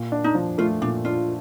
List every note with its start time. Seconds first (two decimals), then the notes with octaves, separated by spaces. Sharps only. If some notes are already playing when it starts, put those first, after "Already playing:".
Already playing: A#2
0.12 D4
0.24 D#4
0.35 F3
0.58 A3 F4
0.82 A#2 D4
1.05 D4 F4